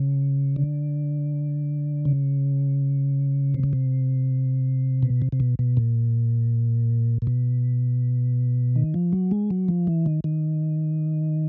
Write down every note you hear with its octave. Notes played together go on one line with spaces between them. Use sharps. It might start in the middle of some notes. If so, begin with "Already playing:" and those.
Already playing: C#3
D3
C#3
C3
C#3
C3
B2
C3
C3
B2
B2
A#2
A#2
B2
D#3
F3
F#3
G#3
F#3
F3
E3
D#3
D#3